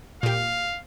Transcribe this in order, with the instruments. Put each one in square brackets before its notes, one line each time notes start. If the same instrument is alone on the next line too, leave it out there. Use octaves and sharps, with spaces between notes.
[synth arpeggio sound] A#2 G4 [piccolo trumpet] F5